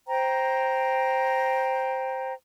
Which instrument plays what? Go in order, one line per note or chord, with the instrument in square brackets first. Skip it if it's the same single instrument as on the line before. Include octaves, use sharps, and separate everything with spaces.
[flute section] C5 G5 A#5